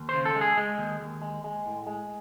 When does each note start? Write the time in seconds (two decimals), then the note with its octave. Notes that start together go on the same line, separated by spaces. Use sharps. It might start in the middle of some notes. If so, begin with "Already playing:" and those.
Already playing: D#2
0.09 C#3 C5
0.25 A4
0.35 G#3
0.41 G#4
0.57 G#3
0.78 D#2
1.01 D#2
1.22 G#3
1.44 G#3
1.66 A2
1.86 G#3